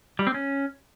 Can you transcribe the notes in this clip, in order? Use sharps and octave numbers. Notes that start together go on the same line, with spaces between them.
G3
C4
C#4